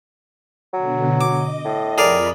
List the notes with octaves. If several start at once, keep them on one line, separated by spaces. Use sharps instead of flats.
B2 D3 F#3
D#5 D6
A2
F2 F4 G#4 A#4 D5 B5